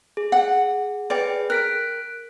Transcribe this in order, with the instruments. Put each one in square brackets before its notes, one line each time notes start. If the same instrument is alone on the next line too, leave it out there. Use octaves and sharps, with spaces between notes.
[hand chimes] G#4
[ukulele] F#5
[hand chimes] G#4 B4 G5 [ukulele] D5
[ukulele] A#4 [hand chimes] F#6 B6 D7